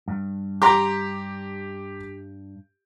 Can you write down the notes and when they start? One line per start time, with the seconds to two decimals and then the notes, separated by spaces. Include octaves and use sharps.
0.08 G2
0.62 G4 A#5 C6 D6